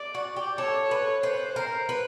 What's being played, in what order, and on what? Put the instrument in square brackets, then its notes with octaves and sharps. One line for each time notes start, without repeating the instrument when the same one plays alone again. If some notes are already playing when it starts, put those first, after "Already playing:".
Already playing: [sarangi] D5
[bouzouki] F#4
G4
[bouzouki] A4 [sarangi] C#5
[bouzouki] B4
[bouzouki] B4 [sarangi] C5
[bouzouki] A#4
B4